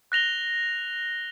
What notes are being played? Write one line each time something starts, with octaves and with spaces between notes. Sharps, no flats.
F#6 A#6 F7 G7